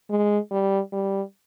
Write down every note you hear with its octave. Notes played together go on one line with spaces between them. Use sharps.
G#3
G3
G3